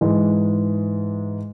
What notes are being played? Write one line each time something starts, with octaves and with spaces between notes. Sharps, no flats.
G#2 E3 G#3